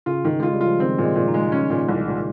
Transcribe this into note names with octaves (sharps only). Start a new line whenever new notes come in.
C#3 F4
D#3
G#3 F4
G3
F4
F3
D#3 C4
A#2
G#3
A#2
D#4
G#3
C#4
A#2
C2
A#2